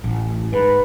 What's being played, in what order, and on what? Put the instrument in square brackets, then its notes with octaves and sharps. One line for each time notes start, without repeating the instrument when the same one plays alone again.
[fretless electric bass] A1
[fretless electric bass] G#2 [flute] B4